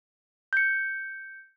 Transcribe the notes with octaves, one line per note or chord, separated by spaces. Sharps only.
G6 C#7